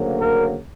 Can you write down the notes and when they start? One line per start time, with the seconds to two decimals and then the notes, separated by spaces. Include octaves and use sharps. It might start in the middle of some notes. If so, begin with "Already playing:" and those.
Already playing: D2 C#3 F#3 A#3
0.20 A#4